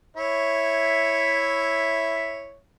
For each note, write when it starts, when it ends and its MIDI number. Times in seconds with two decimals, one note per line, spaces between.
0.17 2.56 64
0.17 2.56 73
0.17 2.56 76